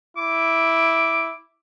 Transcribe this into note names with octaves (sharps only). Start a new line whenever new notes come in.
E4 D6